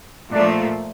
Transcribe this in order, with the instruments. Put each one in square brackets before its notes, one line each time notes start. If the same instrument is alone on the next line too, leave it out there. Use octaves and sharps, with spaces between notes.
[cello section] A#2 F3 A3 [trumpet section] D4